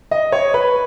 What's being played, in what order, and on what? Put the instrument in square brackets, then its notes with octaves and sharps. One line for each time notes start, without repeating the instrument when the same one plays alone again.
[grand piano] D#5
C#5
B4